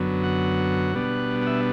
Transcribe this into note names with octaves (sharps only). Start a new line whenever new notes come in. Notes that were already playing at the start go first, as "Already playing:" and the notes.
Already playing: F#2 D3 F#3 B3
F#5
B2 G3 B3 D4
F#5
E5